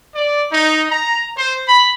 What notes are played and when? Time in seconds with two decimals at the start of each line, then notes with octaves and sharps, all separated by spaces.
0.13 D5
0.50 D#4
0.90 A#5
1.35 C5
1.66 B5